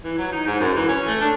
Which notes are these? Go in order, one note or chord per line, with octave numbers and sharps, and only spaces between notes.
E3
F#3
D#4
G#2
F#2
E3
C#4
A3
D4